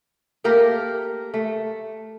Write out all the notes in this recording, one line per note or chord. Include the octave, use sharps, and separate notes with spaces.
A3 A#3 G4 A#4
A3